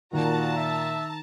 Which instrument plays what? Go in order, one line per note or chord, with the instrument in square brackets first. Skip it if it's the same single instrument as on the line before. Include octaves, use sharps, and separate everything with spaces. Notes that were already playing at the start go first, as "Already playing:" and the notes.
[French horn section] A#2 [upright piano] D#3 [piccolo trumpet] F#4 [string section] A5 A#5
[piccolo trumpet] E5